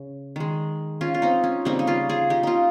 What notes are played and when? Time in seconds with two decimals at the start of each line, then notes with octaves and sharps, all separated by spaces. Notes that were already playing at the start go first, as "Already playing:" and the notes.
Already playing: C#3
0.36 D#3 G#3
1.01 C#4 F4
1.14 F4
1.22 C4 D#4
1.44 C#4
1.65 C#3 G3 A#3 C4 D#4
1.79 D#4
1.87 C#4 F4
2.09 F4 G#4
2.30 D#4 G4
2.43 C#4 D#4 F4